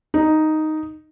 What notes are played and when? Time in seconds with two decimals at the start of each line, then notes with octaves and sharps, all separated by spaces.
0.14 D#4